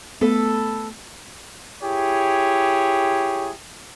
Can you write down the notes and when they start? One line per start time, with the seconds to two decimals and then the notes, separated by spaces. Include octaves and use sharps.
0.21 A3 B3 A4 B4
1.83 E4 G4 G#4 C#5